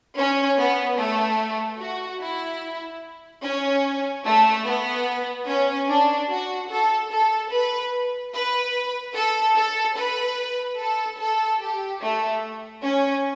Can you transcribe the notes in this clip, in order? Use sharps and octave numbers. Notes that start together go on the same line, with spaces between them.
C#4
B3
A3
F#4
E4
C#4
A3
B3
C#4
D4
F#4
A4
A4
B4
B4
A4
A4
B4
A4
A4
G4
A3
C#4